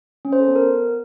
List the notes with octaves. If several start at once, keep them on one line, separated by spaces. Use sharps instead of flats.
C#4
C5
A4
B3
A#4